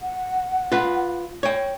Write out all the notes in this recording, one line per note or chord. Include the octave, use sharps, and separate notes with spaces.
F#5
F4 B4
C#5 G5